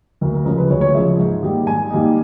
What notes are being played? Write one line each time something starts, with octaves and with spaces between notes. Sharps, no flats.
D2 A#4
A#4
C#3 F3 G#3 A#4
B4
D2 C#5
C#5
C#3 F3 G#3 E5
G#2
D#3 G3 A#3 D#4
G#2 G#5
D#3 G3 A#3 D#4